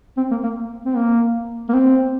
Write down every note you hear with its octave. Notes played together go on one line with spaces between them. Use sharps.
C4
A#3
A#3
C4
A#3
A#3
C4